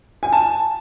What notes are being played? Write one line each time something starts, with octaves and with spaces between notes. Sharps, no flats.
G#5
A5